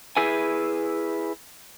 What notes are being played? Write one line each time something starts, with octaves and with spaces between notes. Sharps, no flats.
E4 G#4 B4 G#5